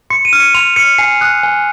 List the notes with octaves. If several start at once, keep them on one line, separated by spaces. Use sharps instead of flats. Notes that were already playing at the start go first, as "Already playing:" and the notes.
C6 C#7
D#7
F6
C#7
C6 F7
F6 C#7
G#5 C7
D#6 F#6
G#5